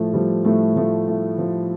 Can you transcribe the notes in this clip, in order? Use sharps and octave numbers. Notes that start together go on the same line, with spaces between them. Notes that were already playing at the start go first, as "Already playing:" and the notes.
Already playing: A2 F3 A3
F3 G3
A2 A3
F3 A3
A2
F3